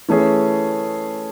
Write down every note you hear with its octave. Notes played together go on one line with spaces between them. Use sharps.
E3 A3 C#4 G#4